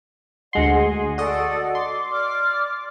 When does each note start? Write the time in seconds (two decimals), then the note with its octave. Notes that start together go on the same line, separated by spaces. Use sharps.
0.53 D2 G#3 D#5 F#5 C6
0.73 G#4
1.18 F#4 A4 D5 D#5
1.75 C6 D6
2.10 D5 D6 F6